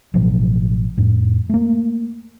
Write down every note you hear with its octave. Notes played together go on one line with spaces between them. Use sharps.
A1 B2 F3 F#3
F2 A2
A3 A#3